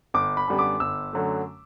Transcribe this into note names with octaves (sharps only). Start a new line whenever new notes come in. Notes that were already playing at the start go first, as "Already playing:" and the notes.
G1 D6
B5
F#2 D3 G3 B3
D6
G1 E6
F#2 D3 F#3 A3